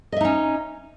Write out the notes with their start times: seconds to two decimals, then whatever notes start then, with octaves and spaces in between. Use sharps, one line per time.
0.12 D#5
0.17 E5
0.21 D#4
0.25 C#4